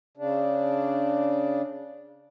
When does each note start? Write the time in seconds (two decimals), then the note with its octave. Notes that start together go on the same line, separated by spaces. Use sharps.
0.17 C#3 D4